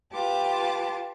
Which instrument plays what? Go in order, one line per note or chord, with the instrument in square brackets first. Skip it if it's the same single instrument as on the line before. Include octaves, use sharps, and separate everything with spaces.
[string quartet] F4 G4 B4 A5 D6